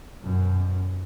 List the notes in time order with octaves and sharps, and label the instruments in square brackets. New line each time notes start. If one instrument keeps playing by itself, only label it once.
[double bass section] F#2 B2